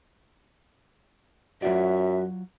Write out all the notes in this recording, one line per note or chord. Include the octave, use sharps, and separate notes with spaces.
F#2 F#3 F4 F#4 D5 E5